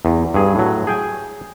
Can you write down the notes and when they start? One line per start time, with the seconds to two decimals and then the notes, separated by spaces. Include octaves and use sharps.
0.05 E2
0.34 G2 G#4
0.55 A2 F#3
0.87 G#4 G5 G#5